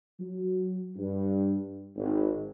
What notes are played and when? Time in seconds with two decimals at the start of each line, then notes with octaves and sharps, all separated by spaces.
0.18 F#3
0.96 G2
1.96 G#1